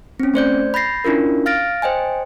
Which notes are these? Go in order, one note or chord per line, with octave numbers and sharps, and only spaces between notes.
C4 C#4
A3 C5 D5 G6
B5 G6 A6 A#6 C7
C#4 D4 E4 F4 A#4
F5 F6 A6 A#6 D7
C5 D#5 G5 G#5